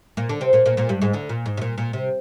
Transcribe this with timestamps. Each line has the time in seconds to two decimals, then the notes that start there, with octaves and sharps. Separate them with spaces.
0.17 A#2 A#3
0.29 D3 D4
0.41 C3 C4
0.53 A#2 A#3
0.65 A#2 A#3
0.77 A#2 A#3
0.89 G2 G3
1.02 G#2 G#3
1.13 D2 D3
1.29 A#2
1.46 G#2
1.57 C3
1.62 A#2
1.78 A#2
1.93 C3